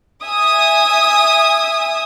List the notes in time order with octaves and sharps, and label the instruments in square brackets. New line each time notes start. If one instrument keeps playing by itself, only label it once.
[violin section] E5 G#5 D#6